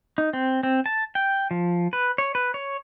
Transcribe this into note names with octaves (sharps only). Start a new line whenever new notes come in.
D#4
C4
C4
A5
G5
F3
B4
C#5
B4
C#5